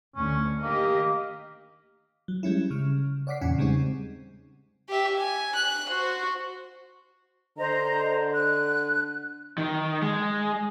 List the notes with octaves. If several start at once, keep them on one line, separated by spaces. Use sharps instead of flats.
D2 D3 C#4
D#3 A#3 G4 D#5
F#3
G3 G#3 C#4 E4
C#3 F6
C#5 D5 F#5 D6 B6 C7
E2 A#2 C#3 C#4 F#5 G#5
C#3 G3 G#3 C4 D#4
G4 E5
G#5
F#6
F#4 C5
D3 C5 D#5 A#5
F#6
D#3
G#3